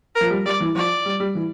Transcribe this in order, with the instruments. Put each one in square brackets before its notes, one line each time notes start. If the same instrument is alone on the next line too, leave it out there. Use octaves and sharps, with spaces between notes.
[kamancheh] A#4
[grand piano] F3
G3
[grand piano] G3 [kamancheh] D5
[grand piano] E3
[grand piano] F3 [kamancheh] D5
[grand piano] G3
G3
E3